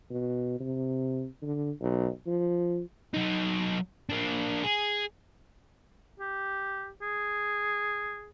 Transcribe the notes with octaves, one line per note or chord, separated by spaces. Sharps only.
B2
C3
D3
B1
F3
F#3 D#4
A#3 D4
G#4
G4
G#4